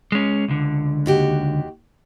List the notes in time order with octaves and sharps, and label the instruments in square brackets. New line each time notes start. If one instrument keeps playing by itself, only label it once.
[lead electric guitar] G#3 C#4
C#2 D3
[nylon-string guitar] D#2 F#4 G4